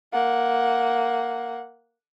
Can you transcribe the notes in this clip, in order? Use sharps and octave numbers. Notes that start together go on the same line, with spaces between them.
A#3 F#5